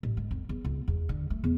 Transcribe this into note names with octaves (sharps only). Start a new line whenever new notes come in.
A1
G#2
F2
E2
C#2
E2
D3
A3
E2